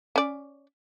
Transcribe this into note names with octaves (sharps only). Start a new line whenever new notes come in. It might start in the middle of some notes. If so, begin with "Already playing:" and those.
C#4 D5